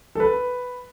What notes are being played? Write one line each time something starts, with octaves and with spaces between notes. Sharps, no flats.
A4
B4